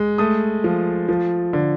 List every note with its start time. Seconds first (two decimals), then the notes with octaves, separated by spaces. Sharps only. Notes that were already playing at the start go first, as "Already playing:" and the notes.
Already playing: G#3
0.18 A3 D#6
0.64 F3
1.08 F3
1.53 D3